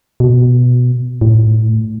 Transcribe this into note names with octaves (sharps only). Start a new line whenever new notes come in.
B2
A2